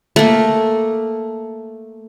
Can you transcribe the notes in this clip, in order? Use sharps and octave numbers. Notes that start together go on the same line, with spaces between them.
A3 A#3